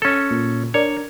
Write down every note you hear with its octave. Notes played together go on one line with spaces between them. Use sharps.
C#4 A4
A#2
D4 A#4 C#5 D5